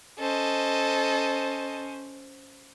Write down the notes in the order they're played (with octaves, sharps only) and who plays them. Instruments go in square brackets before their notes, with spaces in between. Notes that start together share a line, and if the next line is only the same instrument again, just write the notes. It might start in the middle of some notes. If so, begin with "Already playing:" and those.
[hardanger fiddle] C#4 C5 [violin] A4 D#5